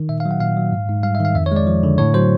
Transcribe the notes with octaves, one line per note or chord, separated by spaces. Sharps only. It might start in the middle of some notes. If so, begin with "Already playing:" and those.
Already playing: D#3
A#2 E5
F5
F#3
F#5
A#2 F5
F#3
G#2
G#2
G3 F5
E5
D#3 F5
F2 E5
C#5
G#3 D5
F3
D3
A2 C#5
F#3 C5